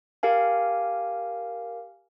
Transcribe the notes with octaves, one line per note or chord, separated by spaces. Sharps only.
G4 A#4 F5 G#5